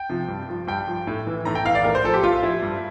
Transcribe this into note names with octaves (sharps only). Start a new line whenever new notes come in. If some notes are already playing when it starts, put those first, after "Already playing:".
Already playing: G5
C3 F3
G2
F3
G2 G5
F3
A2
E3
A2 A#5
G5
E3 F5
D5
A2 A#4
C5
F3 A4
G4
A2 F4
F3 E4
G2